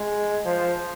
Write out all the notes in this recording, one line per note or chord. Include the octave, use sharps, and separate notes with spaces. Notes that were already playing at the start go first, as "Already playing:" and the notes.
Already playing: G#3
F3